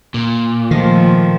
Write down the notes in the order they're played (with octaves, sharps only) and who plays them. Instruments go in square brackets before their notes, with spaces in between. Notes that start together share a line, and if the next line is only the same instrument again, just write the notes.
[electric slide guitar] A#2
[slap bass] D#3 [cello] F3 A3